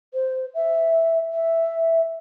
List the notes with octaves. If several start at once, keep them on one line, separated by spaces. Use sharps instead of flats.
C5
E5
E5